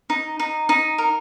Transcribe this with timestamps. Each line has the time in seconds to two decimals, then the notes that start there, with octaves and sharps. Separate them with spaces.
0.10 D#4
0.39 D#4
0.69 D#4
0.98 A#4